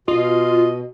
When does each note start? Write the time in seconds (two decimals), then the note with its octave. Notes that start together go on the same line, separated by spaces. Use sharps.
0.08 B2 F4 D#5